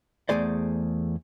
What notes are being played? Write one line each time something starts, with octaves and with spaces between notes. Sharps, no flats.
E2 G#3 A3 G#4 C5 D5